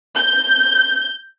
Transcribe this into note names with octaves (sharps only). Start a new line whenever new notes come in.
G6